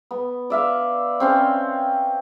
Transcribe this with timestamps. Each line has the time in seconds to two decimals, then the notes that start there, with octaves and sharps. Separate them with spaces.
0.11 B3
0.50 D5 E5 F5
1.20 C4 C#4 C6